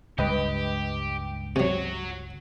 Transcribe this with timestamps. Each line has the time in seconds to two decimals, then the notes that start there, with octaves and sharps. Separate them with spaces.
0.18 C#2 G2 G#3 G4 B4 D#5 G5
1.56 C3 F#3 F#4 C#5